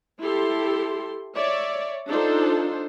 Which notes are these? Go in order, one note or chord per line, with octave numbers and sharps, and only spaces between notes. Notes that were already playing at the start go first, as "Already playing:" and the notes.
E4 G4 A4 C6
C#5 D5 E5
D4 D#4 F4 A4 C5